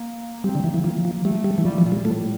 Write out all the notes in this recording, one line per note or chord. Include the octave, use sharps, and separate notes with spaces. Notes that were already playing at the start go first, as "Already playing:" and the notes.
Already playing: A#3
G3 C4
D3
E3 A#3
E3
F3 A#3
F3
G3 A3
G3
E3
F3 G3
F3
A#2
G3
A2 A3